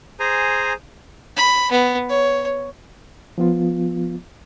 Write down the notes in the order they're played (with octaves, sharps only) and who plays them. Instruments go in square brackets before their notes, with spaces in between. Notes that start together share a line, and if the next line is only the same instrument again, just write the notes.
[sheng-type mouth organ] G#4 C5 G#5 A#5
[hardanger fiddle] B5
B3
C#5
[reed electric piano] F3 B3 F4